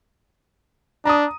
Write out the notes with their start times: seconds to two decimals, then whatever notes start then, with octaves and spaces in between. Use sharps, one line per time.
1.05 D4 A#5 D#6